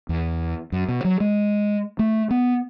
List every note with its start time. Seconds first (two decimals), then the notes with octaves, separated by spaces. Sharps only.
0.09 E2
0.72 F#2
0.89 B2
1.05 F#3
1.20 G#3
1.99 A3
2.31 B3